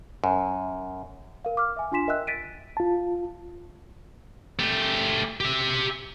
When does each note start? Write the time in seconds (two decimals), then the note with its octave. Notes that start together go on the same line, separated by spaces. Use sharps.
0.24 F#2
1.45 A#4 F5
1.57 D6 F6
1.77 E5 G#5
1.92 D4 F4 G#5 C6 B6 E7
2.08 A#4 D#5 E5 G5 E6 F#6
2.27 A6 B6 D7 D#7
2.77 F4 A5
4.59 A3 G4
5.40 G4 E5